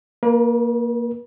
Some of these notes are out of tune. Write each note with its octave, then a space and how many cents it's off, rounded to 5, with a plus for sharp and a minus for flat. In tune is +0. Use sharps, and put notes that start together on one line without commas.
A#3 +0 B4 -45